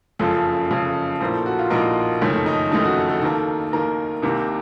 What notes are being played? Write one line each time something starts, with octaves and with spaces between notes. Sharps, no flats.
F#1 F2 C#3 F3 A4
F#1 F2 C#3 F3
A#1 A2 F3 A#3 C5
A4
F#4
F4
A#1 A2 F3 A#3 D#4
F#1 F2 D#3 A3 C#4
D#4
F#1 F2 D#3 A3 D#4
F#4
A4
A4
D#2 D#3 A#3 A4
D#2 D#3 A#3 A#4
C2 C3 D#3 A#3